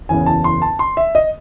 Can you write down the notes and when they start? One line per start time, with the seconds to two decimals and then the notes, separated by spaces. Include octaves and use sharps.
0.09 F#1 E2 C#3 G#5
0.26 A5
0.44 C6
0.62 A5
0.79 C6
0.97 E5
1.15 D#5